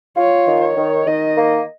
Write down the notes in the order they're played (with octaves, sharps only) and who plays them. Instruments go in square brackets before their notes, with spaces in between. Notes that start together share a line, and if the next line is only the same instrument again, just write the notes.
[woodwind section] F4 [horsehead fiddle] C#5
[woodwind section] D#3
[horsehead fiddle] C#5
[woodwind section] D#3
[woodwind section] D#3 [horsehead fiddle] D#5
[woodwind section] A#3